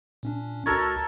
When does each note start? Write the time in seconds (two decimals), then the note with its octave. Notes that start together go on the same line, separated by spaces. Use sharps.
0.23 A#2 C#4 D4
0.66 C#2 F#4 A4 A#4 C#5 A6